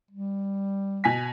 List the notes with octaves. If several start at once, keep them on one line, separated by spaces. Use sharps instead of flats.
G3
B2 G#5 B6